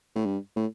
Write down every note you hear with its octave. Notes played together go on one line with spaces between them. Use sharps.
A2
G2
A2